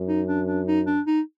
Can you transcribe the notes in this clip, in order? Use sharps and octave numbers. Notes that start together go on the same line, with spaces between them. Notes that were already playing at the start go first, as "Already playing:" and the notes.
Already playing: F#2
D#4
D4
D4
D#4
D4
D#4